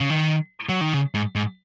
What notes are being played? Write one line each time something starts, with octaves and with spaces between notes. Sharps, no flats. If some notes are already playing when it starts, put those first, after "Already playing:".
C#3
D#3
F#3
D#3
C#3
G#2
G#2